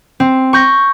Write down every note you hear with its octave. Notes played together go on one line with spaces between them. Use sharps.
C4
C#6 G6 A#6